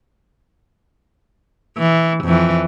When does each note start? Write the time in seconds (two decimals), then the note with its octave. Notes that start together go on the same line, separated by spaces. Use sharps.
1.77 E3
2.24 F2 E3